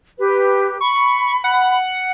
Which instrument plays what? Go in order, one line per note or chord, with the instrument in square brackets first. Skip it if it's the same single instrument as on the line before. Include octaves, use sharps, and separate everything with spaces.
[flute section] G4 B4
[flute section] B5 [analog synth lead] C#6
[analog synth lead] F#5